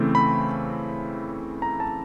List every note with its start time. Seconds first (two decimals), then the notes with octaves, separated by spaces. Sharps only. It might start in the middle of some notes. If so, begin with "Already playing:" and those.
Already playing: C#3 E3 A3 C4
0.15 B5
1.62 A#5
1.80 A5